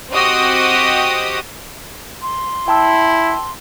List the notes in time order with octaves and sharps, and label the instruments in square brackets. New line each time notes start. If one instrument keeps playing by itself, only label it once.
[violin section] C4 F#4 G4 D#5 D#6
[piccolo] C6
[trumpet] E4 [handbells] G5 A5 E6